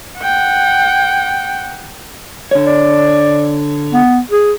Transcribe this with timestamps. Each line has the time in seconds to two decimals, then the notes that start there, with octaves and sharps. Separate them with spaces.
0.19 F#5 G5
2.51 D3 C#5
2.67 D5
3.93 B3
4.31 G#4